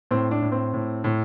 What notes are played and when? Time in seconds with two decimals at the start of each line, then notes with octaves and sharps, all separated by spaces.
0.11 A2 C4
0.31 D4
0.42 A2
0.52 C4
0.74 A2
1.04 A2